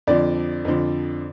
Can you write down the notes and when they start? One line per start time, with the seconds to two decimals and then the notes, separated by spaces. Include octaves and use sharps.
0.07 F2 D3 F3 D5
0.65 F2 D3 F3